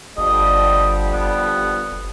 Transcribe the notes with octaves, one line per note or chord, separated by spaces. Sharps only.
G1 D3 F3 G3 D#5
F#1 B3